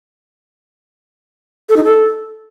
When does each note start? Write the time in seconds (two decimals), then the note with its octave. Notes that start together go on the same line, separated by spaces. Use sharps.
1.69 A4
1.76 D#4
1.84 A4